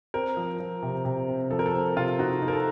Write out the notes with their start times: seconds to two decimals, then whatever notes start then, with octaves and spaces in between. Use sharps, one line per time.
0.14 C4 A#4
0.37 F3
0.60 F3
0.82 C3
1.05 C3
1.28 C4
1.50 F3 A4
1.59 A#4
1.66 A4
1.74 C4
1.97 C3 F4
2.19 D#4 F#4
2.42 D#4
2.48 A#4
2.53 A4